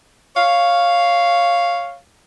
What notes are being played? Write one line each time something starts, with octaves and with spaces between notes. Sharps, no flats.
C#5 F5